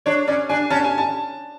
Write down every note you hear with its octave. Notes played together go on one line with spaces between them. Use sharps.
D4 C#5
C#4 D5
D4 G#5
C#4 A5
G#5
A5